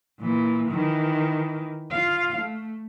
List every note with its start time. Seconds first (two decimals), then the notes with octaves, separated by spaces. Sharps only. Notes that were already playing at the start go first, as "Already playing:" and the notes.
0.20 A#2 E3
0.68 D#3 E3
1.92 F4 F5
2.38 A3